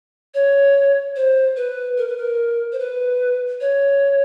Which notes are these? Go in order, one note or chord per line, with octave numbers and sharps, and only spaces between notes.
C#5
C5
B4
A#4
B4
A#4
C5
B4
C#5